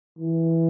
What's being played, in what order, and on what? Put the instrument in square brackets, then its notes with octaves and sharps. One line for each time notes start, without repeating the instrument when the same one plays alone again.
[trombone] E3